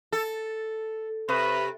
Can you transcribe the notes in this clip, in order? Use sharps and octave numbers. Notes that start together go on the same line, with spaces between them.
A4
C3 B4